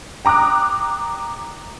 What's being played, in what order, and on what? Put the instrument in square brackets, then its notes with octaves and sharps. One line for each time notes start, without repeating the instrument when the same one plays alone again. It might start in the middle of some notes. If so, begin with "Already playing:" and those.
[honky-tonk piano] G5 A#5 D6 D#6 F#6